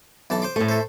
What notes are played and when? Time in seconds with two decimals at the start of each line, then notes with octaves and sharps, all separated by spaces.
0.30 B1 E3 A5
0.42 C5 C6 D6
0.56 A2 A3
0.69 A4 C5